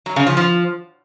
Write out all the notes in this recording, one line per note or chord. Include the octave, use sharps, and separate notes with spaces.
F#3
C#3
F3
F3